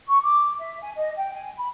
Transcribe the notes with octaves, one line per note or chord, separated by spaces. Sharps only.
C#6
D6
E5
G#5
D#5
G5
G#5
B5